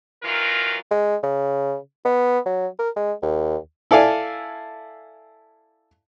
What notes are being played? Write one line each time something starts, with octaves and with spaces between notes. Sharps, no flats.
D#3 E3 F#3 F4 A#4
G#3
C#3
B3
F#3
A#4
G#3
D#2
E4 A4 D5 F5 G#5